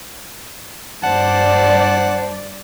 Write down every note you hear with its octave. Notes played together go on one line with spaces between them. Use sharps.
G2 C5 D5 F#5 A5